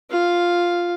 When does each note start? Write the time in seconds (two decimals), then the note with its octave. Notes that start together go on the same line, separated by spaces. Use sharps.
0.10 F4 F5